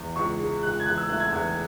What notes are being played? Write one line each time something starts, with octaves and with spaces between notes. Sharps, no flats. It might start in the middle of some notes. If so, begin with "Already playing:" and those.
Already playing: E2
C#2 C#6
G#3
C#2 F#6
G#6
E2 F#6
E6
A3 F#6
G#6
E2